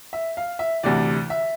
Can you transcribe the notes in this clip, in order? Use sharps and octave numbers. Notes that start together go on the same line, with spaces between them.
E5
F5
E5
D2 C3 E3 D5
E5